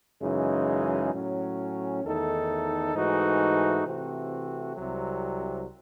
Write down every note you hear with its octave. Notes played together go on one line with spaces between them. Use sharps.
F#2 C#3 E3 G#3 D#4
A2 F#3 C#4
E2 D#3 A3 D#4 A4
G#2 E3 A3 D#4 F#4
C3 E3 A3 C4 F#4
C2 C3 F#3